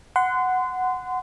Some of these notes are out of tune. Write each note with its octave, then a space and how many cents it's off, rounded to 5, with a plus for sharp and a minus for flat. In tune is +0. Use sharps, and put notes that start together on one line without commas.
F#5 +0 C6 -30